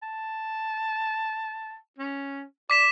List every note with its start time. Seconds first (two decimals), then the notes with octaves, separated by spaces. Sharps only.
0.03 A5
1.98 C#4
2.70 D5 D6 B6 E7